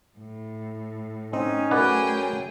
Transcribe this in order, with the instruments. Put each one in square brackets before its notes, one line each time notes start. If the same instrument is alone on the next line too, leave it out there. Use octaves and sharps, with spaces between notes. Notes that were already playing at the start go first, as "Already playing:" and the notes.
[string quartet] A2
[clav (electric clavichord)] C4 [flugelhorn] C#4 [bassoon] D#4
[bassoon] F#2 [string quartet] A3 G#4 G5 [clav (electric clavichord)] B4 D5 F#5